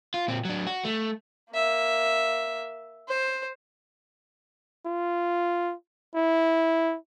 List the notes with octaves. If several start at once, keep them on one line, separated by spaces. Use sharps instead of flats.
F4
A#2 C4
F#3 D4
F#4
A3
A#3 E5
C5
F4
E4